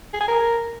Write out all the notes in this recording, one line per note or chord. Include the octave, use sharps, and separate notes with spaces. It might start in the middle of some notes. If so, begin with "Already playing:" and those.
G#4
G#5
A#4